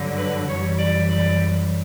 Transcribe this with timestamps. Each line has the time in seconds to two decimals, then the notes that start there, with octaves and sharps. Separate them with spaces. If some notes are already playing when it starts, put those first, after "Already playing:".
Already playing: G2 D3 F#3
0.17 B4
0.48 F#2 E3 G3 C#5
0.78 D5
1.09 D5